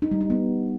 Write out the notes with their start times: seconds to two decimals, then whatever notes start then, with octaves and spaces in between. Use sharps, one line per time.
0.02 D#4
0.11 G3
0.21 D#4
0.30 B3